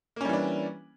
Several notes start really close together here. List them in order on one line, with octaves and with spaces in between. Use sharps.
A#3 C#4 G3 E3 D4